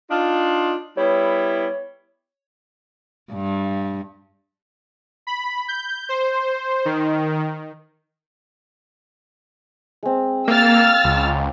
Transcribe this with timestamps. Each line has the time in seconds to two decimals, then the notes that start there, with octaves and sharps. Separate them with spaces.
0.11 D4 D#4 F4
0.97 G3 B3 E4 C#5
3.32 G2
5.27 B5
5.68 G6
6.09 C5
6.85 D#3
10.03 G#3 C4
10.48 A#3 F5 G5 E6 F6 A6
11.04 C#2